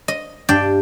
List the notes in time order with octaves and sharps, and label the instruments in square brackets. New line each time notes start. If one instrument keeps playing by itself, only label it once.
[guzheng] D#5
[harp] G2 [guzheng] D4 D5 G5